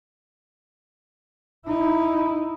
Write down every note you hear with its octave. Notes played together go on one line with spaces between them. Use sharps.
D#4 E4